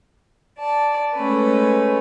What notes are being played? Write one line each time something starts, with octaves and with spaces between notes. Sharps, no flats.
D5 A5
G#3 A3 C#4 B4